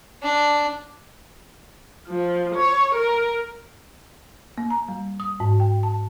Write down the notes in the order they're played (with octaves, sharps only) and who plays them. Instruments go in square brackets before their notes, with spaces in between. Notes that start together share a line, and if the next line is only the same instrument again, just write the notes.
[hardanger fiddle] D4
[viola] F3
C#5
A#4
[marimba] A#3
A#5
G3
D#6
G#2
G5
A5